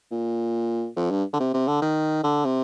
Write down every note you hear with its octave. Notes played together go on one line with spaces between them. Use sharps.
A#2
F2
G2
D3
C3
C3
D3
D#3
D3
C3